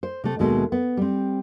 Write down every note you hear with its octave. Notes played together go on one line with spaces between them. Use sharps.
C5
C3 A3
D#2 B2 G#3 A3 D#5
B3
G3 C4